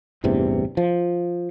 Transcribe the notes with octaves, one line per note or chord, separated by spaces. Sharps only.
A1 E2 G2 C3
F3